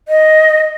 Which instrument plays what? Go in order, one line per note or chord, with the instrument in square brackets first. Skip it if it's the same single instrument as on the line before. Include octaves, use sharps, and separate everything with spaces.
[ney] D#5